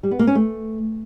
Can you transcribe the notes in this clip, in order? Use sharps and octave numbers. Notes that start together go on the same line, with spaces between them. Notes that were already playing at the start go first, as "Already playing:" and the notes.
G3
B3
A#3
C#4
A3